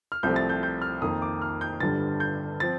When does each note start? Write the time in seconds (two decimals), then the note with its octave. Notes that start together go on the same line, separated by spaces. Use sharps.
0.12 F6
0.23 C2 C3 F3 A3 C4 G6
0.36 A6
0.49 G6
0.63 G6
0.82 F6
1.02 F2 D#3 A#3 D#6
1.22 D6
1.42 F6
1.61 G6
1.80 G1 G2 D3 G3 A6
2.20 G6
2.60 F3 C4 A6